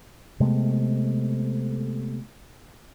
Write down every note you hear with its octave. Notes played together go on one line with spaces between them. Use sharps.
C3 G#3 A3 B3